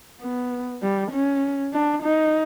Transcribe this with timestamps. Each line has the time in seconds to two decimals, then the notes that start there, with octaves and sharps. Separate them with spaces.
0.20 B3
0.82 G3
1.11 C#4
1.73 D4
2.03 D#4